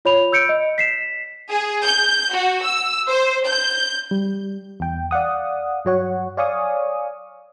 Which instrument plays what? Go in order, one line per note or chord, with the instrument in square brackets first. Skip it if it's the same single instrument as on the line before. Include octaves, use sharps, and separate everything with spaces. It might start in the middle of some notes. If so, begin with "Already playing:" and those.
[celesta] F4 C#5 B5 F7
E6 G6 C#7 D7
D#5
B6 C7 E7
[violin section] G#4
G6
F#4
E6
C5
G6
[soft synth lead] G3
[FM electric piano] E2 G5
D5 F5 F#5 D#6
G2 F#3 C#5 F#5
C#5 D5 F5 G#5 C#6 D#6